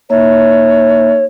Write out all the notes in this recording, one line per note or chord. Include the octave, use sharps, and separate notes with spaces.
A#3 D#4 C#5 E5